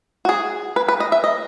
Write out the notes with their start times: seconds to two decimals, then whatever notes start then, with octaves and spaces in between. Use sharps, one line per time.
0.25 F#4
0.29 G#4
0.76 B4
0.88 B4
1.00 D#5
1.12 E5
1.24 D#5